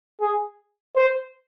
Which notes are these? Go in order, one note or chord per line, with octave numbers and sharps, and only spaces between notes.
G#4
C5